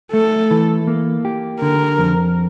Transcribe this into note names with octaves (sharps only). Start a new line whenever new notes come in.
A3 A4
E3
A#3
G4
D3 A#4
F2